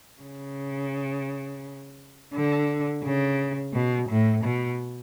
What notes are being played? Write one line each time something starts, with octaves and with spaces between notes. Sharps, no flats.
C#3
D3
C#3
B2
A2
B2